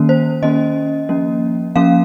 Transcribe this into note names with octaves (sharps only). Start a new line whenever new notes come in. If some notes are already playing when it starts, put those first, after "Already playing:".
Already playing: D#3 A#3 C#4
C5
D#3 A#3 C#4 D#5
F3 A#3 C#4
F3 A#3 C#4 F5